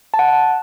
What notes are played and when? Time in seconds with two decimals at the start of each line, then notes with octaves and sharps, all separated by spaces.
0.14 A5
0.19 F#5